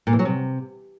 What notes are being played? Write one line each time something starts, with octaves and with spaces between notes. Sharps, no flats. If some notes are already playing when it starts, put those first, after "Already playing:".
A#2
E3
F#3
C3